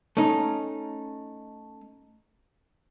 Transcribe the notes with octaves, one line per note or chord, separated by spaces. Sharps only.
A3 C#4 D#4